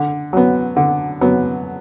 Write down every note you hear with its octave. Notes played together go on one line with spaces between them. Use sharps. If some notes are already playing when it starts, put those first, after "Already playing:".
Already playing: D3
F#3 B3
D3
F#3 B3